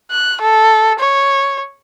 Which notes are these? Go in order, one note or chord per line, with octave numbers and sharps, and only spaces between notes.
F#6
A4
C#5